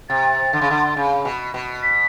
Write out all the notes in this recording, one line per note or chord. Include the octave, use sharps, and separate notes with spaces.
C3 A6
D3
C#3
D3
C#3
B2
B2
B6